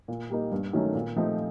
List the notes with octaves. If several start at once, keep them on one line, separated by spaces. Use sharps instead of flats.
A#2
G3 A#3 D#4
G2
D#3 F#3 A3 C#4
A#2
F3 A3 C4 D#4